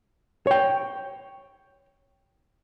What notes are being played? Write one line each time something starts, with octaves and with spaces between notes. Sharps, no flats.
C#5 G5